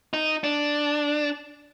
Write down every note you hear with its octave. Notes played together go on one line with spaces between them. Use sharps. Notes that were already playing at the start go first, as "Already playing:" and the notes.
D#4
D4